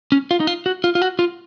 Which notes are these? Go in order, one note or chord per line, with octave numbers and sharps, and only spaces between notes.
C#4
F4
D#4
F4
F#4
F4
F4
F#4
F4